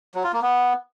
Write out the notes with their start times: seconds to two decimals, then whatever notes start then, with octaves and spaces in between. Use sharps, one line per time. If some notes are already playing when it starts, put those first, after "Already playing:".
0.15 F#3
0.24 F4
0.33 A#3
0.42 B3